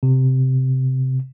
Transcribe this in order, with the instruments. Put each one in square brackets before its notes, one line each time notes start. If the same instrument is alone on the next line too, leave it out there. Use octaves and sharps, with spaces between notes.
[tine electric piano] C3